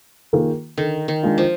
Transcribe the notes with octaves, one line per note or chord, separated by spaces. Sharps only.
D#3 A#3 F4 G#4
D3 D#3
D#3
G#3 D4 F4
F3